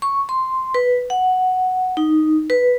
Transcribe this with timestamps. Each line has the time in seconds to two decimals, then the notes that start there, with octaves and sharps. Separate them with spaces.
0.02 C#6
0.29 C6
0.74 B4
1.10 F#5
1.97 D#4
2.50 B4